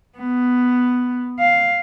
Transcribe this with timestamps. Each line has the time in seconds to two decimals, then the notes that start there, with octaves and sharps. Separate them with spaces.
0.18 B3
1.40 F5